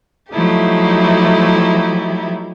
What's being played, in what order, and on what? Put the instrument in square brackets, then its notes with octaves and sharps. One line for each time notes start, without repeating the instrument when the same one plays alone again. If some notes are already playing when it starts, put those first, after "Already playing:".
[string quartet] F3 F#3 A3 D#4 E4 G4